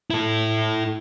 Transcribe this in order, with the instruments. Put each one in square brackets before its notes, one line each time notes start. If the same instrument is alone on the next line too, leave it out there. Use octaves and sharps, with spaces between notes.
[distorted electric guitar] E4 A4